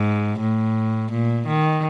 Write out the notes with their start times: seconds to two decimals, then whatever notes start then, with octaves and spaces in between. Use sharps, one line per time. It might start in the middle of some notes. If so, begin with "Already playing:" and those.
Already playing: G#2
0.40 A2
1.11 A#2
1.47 D#3